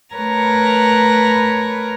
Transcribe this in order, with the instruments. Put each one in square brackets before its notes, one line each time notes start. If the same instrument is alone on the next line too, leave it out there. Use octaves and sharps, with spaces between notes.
[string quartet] A3 A#4 B4 C#5 A#5